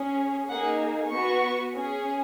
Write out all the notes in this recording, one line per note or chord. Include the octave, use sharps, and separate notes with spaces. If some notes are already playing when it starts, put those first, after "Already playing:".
Already playing: C#4 G#4
A#3 D#4 G#4 F#5
B3 F#4 C#6
C#4 G#4